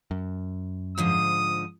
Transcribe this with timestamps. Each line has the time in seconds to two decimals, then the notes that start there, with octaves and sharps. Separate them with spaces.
0.11 F#2
0.98 G#2 D3 F3 D#6